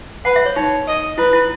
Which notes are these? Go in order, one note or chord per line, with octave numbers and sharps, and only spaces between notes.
B4 F#5
E5
C#5
D#4 C#5
D#5
E4 B4
E4